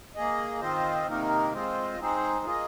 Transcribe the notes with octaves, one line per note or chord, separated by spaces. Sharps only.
A#3 G#4 D#5
D#3 C4 F4 C5 D#5
C3 D#3 A#3 D#4 A#4
G#3 C4 F4 C5 D#5
G#3 C4 D#4 G#4 C5
A#3 F4 G#4 D#5